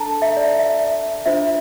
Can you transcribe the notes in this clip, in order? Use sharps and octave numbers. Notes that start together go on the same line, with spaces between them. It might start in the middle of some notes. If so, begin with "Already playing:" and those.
Already playing: D4 A4 A5 A#5
E5
D5
E5
D4 F4 C5 E5